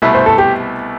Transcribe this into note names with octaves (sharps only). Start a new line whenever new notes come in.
C2 B2 A3 E4 B4
C5
A4
G4